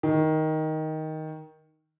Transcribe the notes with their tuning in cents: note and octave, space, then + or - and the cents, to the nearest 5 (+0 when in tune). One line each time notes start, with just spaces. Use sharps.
D#3 +10